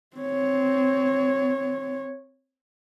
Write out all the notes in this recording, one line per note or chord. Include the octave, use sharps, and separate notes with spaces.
C4 C#5